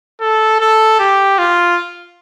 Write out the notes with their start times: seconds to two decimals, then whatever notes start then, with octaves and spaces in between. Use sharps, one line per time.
0.21 A4
0.60 A4
1.00 G4
1.38 F4